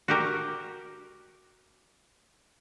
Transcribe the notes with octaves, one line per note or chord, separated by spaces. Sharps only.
F#4 G4 A#4